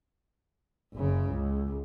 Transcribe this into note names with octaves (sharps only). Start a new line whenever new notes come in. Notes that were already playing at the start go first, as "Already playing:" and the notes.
F#1 C#3
C#2